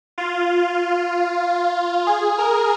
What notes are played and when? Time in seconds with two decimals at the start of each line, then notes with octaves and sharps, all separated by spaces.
0.18 F4
2.07 G#4
2.38 A#4